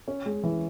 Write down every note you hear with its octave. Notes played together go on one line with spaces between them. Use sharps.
C#4
G#3
E3